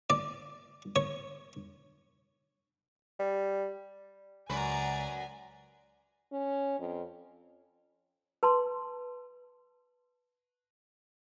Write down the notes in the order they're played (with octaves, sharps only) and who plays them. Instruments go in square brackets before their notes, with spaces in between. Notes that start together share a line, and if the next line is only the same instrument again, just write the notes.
[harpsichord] D5
C#5
[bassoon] G3
[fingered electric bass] C#2 [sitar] F#2 B4 [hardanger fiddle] D5 A#5 [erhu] G#5
[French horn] C#4
F2
[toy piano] B4 A5 C6